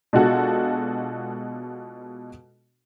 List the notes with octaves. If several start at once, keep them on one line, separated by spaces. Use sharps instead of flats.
B2 G#3 D4 F4 F#4 A4